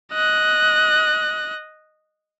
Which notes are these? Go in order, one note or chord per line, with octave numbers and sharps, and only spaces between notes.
D#5 F#6